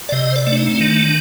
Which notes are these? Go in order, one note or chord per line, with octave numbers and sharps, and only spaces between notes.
D5
C3 D#5
C5
D5
A3
D4
D#4
C4
D#3 D4